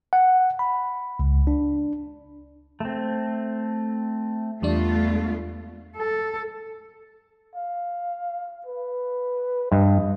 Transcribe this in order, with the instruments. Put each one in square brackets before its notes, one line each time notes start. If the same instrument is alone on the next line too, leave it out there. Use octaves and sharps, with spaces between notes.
[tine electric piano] F#5
B5
C#2
D4
[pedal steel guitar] A3 C4
[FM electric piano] E2 G3 D4 [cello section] A3 B3 F4
[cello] A4
[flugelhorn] F5
B4
[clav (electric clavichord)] G2 [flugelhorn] D#5